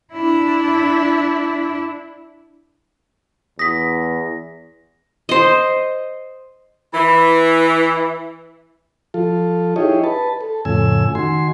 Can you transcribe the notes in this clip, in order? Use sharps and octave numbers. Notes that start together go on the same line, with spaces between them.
D4 E4
E2 D#6 A#6 B6
C5 D#5
E3
F3 F4 A4
D#4 E4 G4 G#4 C#5 D#5
B4 A5
A4
F2 A2 C#3 G#5 E6
D#3 F#4 G#5 C6